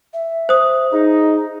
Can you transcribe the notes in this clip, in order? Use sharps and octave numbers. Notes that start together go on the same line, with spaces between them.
E5
C5 D#6
D#4 G#4